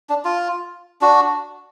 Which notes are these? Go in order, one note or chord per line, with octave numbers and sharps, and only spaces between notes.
D4
F4
D4 F#4